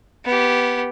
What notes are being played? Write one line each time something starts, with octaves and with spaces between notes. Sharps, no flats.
B3 G4